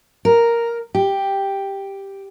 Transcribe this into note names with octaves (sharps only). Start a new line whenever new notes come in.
A#4
G4